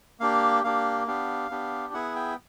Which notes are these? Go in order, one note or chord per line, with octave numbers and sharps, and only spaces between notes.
A#3 D4 G4 F5
A#3 D4 G4 F5
B3 D4 G4 F5
B3 D4 G4
B3 E4 G#4 F#5
G5